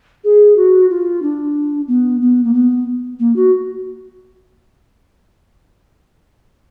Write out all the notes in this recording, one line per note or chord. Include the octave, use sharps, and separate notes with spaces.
G#4
F#4
F4
D4
B3
B3
A#3
B3
A#3
F#4